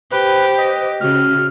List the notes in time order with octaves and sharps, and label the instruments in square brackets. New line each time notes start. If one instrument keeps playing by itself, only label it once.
[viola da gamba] G4 [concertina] B4 [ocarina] C5
[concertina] D#5
[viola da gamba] C#3 [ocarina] F#4 [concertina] F6